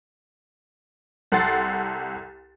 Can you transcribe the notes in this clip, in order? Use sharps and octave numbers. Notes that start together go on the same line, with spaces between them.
C2 A4 F#5 C6 A6 C7